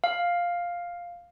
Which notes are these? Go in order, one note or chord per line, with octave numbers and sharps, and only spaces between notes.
F5